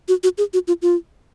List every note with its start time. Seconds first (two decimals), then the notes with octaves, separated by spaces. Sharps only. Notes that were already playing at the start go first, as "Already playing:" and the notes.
0.08 F#4
0.24 F#4
0.38 G#4
0.53 F#4
0.68 F4
0.82 F4